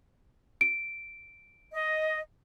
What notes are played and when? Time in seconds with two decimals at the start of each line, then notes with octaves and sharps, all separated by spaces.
0.61 D7
1.72 D#5